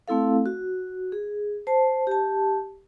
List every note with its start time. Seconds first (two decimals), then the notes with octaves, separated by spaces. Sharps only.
0.08 A3 C4 E4 A4 F5
0.46 F#4
1.12 G#4
1.67 C5 A5
2.07 G4 A5